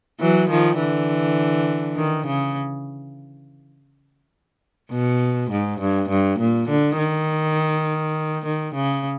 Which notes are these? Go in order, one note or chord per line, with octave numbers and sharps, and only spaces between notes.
E3 F#3
D#3 F3
D3 E3
D#3
C#3
B2
G#2
G2
G2
A#2
D3
D#3
D#3
C#3